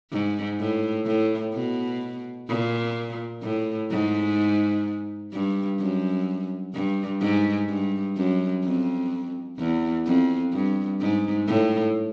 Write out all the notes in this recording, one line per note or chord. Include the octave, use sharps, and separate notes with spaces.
G#2
A2
A2
B2
A#2
A2
G#2
G2
F#2
G2
G#2
G2
F#2
F2
E2
F2
G2
G#2
A2